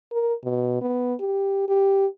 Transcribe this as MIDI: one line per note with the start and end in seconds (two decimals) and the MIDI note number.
0.12 0.34 70
0.44 0.77 47
0.81 1.14 59
1.20 1.67 67
1.68 2.06 67